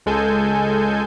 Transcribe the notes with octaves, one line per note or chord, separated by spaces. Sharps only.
C#2 G#3 A4 G#5 G6